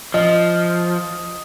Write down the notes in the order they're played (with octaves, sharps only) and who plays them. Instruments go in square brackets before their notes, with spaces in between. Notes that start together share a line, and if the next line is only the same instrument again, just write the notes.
[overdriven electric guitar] F3 [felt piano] D#5